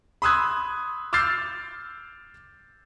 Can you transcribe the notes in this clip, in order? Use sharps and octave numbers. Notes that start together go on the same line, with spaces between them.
B5 C6 D#6 E6 F#6 G#6
D6 E6 F6 G6 A6 C7